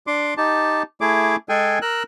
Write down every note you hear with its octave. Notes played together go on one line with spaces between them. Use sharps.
D4 C6 D6
D#4 G4 A5
A3 E4 G#4 D6
G#3 G#4 A4 G5 G#5
A#4 E6 F#6